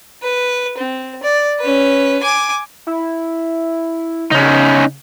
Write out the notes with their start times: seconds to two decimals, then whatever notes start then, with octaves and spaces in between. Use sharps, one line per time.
0.22 B4
0.78 C4
1.23 D5
1.59 C#4 B4
2.23 G#5 D6
2.87 E4
4.31 C#3 C#4 D#4